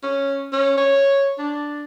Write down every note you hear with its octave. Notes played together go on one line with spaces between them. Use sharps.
C#4
C#4
C#5
D4